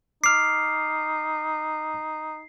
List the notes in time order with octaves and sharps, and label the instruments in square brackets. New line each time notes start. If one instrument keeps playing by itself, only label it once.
[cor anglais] D#4 [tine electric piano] D6 F6 [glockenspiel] C7